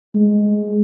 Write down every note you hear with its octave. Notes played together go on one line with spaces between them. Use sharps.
G#3